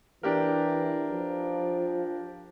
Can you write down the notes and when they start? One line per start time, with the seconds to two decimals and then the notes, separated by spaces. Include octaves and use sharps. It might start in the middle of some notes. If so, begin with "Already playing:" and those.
0.23 E3 D4 G4 A#4
1.11 F3